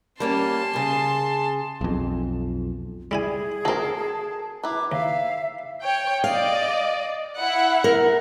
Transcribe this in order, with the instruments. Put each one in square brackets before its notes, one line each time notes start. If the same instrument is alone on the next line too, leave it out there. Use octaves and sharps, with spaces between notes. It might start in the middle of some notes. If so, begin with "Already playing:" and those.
[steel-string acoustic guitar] G3 A#3 C#4 [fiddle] A5 C6
[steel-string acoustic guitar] C#3 G#4
[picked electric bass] B1 F2
[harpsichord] G3 E4 G#5 [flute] G#4
[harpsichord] C4 F#4 [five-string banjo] A4 A#4 [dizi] A5
[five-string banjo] E4 B4 [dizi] A#5 [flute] D6
[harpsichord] D#2 [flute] E5 [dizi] F5
[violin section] C#5 G5
[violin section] D5 D#5 [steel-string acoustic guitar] F5
[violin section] E4 F#5
[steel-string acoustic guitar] A#4